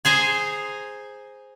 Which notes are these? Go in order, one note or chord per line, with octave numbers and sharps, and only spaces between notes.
G#4 C5 G#5 A#5